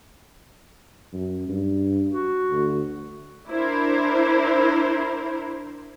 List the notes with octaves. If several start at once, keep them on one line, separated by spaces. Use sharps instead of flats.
F#2
G2
F#4
D2
D4 E4 A#4 C5